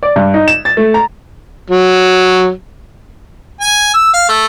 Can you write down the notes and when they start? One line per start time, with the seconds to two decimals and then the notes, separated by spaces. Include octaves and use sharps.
0.03 D5
0.16 G2
0.34 D#4
0.48 E7
0.65 A6
0.77 A3
0.94 A#5
1.70 F#3
3.61 G#5
3.94 E6
4.14 F5
4.29 A3